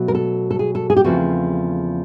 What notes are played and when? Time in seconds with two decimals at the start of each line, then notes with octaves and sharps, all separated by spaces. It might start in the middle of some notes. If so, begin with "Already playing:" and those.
Already playing: B2 F#3 A3
0.08 A#4
0.15 A4
0.51 A4
0.59 G#4
0.75 A4
0.90 G#4
0.97 G4
1.04 E2 C#3 F3 A3 C4 F#4